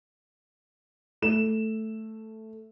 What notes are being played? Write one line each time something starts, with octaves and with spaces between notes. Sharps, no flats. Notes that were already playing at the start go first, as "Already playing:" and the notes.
A3 E7